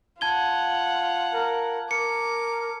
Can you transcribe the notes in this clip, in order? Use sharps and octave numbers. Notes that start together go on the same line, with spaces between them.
F4 F#5 A5 G#6 G7
A#4
A#4 D6 C#7